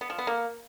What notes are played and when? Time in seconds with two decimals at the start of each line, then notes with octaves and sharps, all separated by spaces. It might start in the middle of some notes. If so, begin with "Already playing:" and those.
0.01 B3
0.10 F3
0.19 B3
0.27 A#3